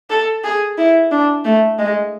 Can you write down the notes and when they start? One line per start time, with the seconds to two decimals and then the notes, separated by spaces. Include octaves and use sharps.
0.10 A4
0.44 G#4
0.78 E4
1.12 D4
1.45 A3
1.79 G#3